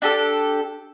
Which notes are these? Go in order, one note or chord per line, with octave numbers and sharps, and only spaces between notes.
D4 G4 A4